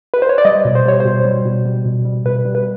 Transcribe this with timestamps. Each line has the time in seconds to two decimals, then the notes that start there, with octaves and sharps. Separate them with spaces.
0.14 B4
0.22 C5
0.29 C#5
0.38 D5
0.45 G3 D#5
0.65 B2
0.75 C5
0.86 G3 C#5
1.00 B2 C5
1.25 G3
1.46 B2
1.66 G3
1.86 B2
2.05 G3
2.25 B2 B4
2.45 G3
2.55 B4